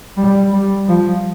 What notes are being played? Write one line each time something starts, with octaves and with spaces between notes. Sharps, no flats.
G3
G3
F3